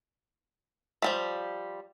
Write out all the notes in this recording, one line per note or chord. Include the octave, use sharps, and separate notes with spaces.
F3 G3 A3